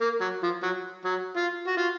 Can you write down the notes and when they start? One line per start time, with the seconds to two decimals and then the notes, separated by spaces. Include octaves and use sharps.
0.01 A#3
0.21 F#3
0.43 F3
0.63 F#3
1.05 F#3
1.37 F4
1.68 F#4
1.77 F4